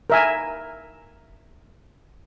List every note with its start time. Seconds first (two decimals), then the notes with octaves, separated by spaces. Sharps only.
0.10 A#4 E5 G#5